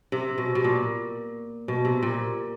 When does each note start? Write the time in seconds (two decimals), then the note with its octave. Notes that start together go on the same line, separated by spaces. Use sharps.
0.12 C3
0.38 B2
0.55 B2
0.64 A#2
1.68 B2
1.85 C3
2.03 A#2